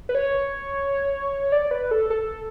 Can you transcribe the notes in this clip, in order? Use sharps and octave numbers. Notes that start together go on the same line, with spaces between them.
B4
C#5
D5
B4
A4
A4